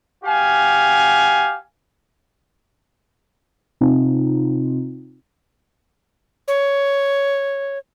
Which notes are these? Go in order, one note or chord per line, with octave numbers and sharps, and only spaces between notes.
F#4 G4 F5 G#5
C3 C4 D#4 F4
C#5